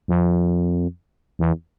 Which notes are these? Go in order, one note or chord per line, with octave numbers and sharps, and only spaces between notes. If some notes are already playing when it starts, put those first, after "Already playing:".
F2
E2